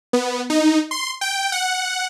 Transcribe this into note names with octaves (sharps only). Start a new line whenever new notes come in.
B3
D#4
C6
G5
F#5